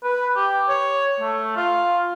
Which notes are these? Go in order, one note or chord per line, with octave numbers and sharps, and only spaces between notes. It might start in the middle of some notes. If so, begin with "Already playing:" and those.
B4
G4
C#5
A3
F4